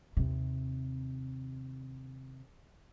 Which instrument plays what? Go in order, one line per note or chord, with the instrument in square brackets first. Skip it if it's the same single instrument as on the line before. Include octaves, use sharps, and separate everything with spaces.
[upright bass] D#2 C3